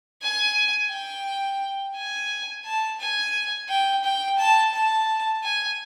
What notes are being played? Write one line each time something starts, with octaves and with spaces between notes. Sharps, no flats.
G#5
G5
G#5
A5
G#5
G5
G5
A5
A5
G#5